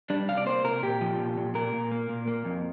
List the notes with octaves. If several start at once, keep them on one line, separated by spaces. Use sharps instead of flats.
G3 D4
C3 F5
D5
A#3 C5
C3 A#4
A#2 G4
F3
A#2
A#2
A#2 A#4
A#2
A#3
A#2
A#3
F2